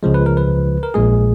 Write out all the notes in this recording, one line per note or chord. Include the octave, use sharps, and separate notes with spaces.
C#2 C#3 F3 G#3
B4
A#4
B4
A#4
A#1 A#2 G#3 G#4